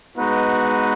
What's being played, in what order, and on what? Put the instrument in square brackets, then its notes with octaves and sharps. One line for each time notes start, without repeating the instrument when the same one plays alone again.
[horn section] G#3 B3 D#4 F#4 B4